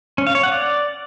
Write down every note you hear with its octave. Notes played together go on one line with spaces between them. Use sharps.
C#4
F5
C#5
F#5
D5